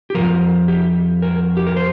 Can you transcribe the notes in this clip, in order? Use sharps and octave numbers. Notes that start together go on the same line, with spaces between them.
G4
F2 C3 F3 A#4
G4
A#4
G4
A#4
C5